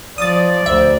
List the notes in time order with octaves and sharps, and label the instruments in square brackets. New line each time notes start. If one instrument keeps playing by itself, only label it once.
[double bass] F3 [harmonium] D5 [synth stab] D#6 A6
[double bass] D2 [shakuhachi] C5 [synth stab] E5